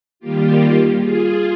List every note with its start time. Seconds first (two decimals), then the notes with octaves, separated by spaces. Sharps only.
0.20 D#3 G3 A#3 F4 G4
0.98 F4 G#4